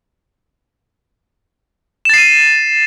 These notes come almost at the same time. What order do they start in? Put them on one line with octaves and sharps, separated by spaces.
E7 A6 C7 D#7